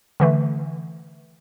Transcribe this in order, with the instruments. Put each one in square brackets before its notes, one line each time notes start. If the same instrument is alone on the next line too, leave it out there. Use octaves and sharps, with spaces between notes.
[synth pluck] D3 E3 A3